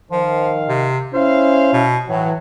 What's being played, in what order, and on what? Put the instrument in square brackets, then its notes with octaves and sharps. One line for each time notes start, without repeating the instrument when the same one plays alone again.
[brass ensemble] D#3 F5 [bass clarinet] F3
[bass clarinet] C3
[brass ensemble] C#4 E4 F5 [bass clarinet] C5
[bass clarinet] B2
[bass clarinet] A2 [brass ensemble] E3 F#3